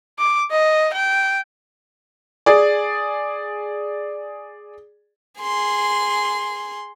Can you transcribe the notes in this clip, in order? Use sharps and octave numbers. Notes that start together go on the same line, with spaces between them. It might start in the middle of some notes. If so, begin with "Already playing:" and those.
D6
D#5
G5
G#4 D5
G#4 C6